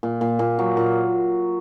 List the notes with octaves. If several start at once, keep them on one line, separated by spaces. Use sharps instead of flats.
A#2
A#2
A#2
F#3
A#2